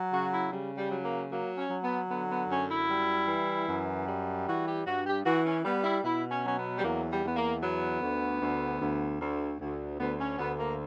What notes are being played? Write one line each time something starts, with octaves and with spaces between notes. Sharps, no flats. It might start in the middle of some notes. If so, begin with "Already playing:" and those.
Already playing: F#3
C#3 F#4
E4
C#3 G3
G3
F#3
A#3
F#3 A#3
C#4
F#3
B3
D3 B3
B3
F#2 C#4
E4
G3
E3
F#2
G3
E3 F#4
G4
G2 F#4
G4
E3 F#4
C#4
G3 B3
E4
B2 E4
C#4
F#3 C#4
B3
G3
E2 A#3
G3
E2 B3
A#3
F#3 B3
D2
D2
D2
D2
D2
D2 B3
C#4
D2 B3
A#3